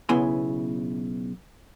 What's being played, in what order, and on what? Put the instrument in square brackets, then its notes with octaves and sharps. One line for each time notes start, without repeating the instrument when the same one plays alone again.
[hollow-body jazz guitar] B1 C#3 B3 E4 G#5 C6